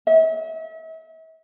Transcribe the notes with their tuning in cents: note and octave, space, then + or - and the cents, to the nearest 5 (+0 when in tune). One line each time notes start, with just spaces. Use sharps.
E5 -40